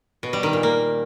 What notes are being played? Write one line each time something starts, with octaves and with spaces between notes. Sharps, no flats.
B2
G3
D#3
A#2
A#3